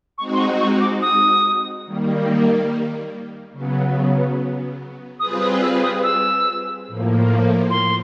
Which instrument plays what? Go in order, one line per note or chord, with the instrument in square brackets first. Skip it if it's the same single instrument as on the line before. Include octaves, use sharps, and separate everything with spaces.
[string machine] G#3 C4 D#4 F#4 [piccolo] C#6
[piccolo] C6
C#6
C#6
D6
D#6
[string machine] D#3 G3 A#3
C#3 F#3 B3
[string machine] G3 C4 F4 G#4 B4 [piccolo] D#6
[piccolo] D#6
E6
D#6
E6
[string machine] A2 F3 A#3
[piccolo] C6